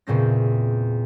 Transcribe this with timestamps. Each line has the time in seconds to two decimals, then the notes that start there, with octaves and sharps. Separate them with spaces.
0.07 E2 A#2 C#3 C4 A#6